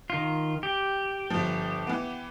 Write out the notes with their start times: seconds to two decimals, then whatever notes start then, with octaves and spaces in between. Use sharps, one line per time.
0.10 D#3 F4
0.63 G4
1.30 G1 F3
1.87 E3 B3